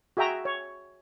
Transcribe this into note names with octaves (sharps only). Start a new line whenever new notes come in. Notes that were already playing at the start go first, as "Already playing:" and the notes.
F#4 G#4 E5 G5 A#5
C#5